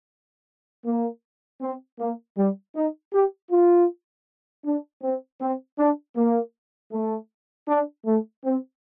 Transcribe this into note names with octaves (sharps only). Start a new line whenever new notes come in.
A#3
C4
A#3
G3
D#4
G4
F4
D4
C4
C4
D4
A#3
A3
D4
A3
C4